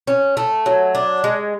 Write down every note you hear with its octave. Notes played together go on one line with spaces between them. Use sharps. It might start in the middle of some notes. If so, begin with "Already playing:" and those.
C#4
A3
F#3
D4
G#3